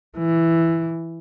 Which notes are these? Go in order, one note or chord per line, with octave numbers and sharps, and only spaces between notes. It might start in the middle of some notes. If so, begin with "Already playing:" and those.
E3